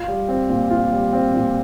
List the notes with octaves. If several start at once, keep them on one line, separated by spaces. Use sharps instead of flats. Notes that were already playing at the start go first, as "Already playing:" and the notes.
Already playing: F4
G3
C4
A#2
F4
G3
C4
A#2